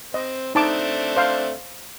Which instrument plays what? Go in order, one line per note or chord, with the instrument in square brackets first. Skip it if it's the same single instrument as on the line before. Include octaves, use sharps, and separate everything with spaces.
[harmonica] C4 [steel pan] D#5
[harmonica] A3 C4 D4 [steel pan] D#4 A5 D6
[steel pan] C5 F5